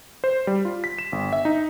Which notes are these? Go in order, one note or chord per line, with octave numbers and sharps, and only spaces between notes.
C5
G3
F4
B6
E7
G1
E5
D#4